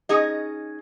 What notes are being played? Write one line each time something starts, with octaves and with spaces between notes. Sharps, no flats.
C#4 D#4 G#4 D#5